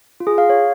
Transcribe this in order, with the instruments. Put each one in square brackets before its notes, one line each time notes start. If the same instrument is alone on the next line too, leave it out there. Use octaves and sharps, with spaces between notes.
[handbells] F4
G#4
F5
C#5